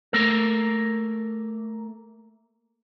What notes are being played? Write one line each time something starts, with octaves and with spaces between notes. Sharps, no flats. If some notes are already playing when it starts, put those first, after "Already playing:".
A3 A#3 A4 A#4